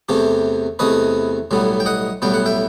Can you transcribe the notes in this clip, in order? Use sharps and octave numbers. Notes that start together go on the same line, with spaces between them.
E2 C3 E3 A3 G4
E2 C3 E3 A3 B4 D#5
B1 A2 E3 G3 B3
G5
D#5 F#5
B1 A2 E3 G3 B3 G5
F#5
E5 G5